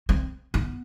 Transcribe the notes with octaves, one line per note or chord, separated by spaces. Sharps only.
C4
B3